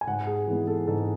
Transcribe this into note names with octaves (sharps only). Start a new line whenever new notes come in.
G#5
G#2 F#5
G#4
E3 G#3 B3
A4
G#2 A4